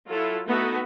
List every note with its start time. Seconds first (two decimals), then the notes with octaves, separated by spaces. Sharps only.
0.10 F#3 E4 F4 A4
0.47 A3 B3 D#4 F#4 A4